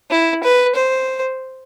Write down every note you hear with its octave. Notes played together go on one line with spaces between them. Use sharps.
E4
B4
C5